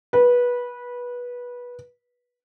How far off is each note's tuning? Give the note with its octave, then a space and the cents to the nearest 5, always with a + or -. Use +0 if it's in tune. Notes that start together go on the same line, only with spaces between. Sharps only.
B4 -20